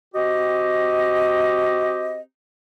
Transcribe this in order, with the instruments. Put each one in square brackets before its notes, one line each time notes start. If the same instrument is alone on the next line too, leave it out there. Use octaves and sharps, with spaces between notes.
[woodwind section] C4 F#4 G4 D#5